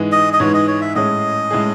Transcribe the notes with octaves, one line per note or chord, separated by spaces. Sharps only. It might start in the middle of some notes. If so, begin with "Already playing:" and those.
Already playing: G#2 E3 G#3
D#5
D#5
G#2 E3 G#3 C#5
D#5
C#5
E5
A2 G#3 C#4 G#4 D#5
A2 G#3 C#4 G#4